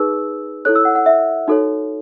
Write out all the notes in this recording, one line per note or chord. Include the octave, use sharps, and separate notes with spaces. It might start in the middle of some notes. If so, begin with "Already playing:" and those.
Already playing: D#4 G#4 B4 E6
E4 A4 C#5 F#6
E6
F#5
F#5
E5
D#4 F#4 A4 C#5